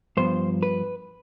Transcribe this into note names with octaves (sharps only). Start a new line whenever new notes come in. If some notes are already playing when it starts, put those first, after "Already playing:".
G2 F3 B3 C5
B4